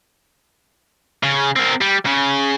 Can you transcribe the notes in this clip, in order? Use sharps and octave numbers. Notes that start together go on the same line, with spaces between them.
C#3
C4 A#4
G3
C#3